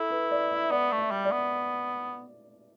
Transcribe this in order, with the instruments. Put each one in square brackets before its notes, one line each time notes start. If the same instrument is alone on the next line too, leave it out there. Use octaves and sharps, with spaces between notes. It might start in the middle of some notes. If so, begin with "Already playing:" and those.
Already playing: [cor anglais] E4 [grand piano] A4
[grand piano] B4
D5
E5
[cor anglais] B3 [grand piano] D5
[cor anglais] A3
[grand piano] E5
[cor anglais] G3
[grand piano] D5
[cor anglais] B3